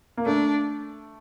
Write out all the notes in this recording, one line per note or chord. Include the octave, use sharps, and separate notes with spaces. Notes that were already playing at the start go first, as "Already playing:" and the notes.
A#3
A3 D4